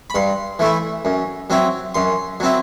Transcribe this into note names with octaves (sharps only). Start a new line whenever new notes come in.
B5
G2 C6
E3 A3 E4
F#2
F#3 C4 E4
F#2 C6
F#3 C4 E4